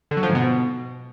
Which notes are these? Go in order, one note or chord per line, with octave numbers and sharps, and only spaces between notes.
D3
F#3
F3
G#2
B2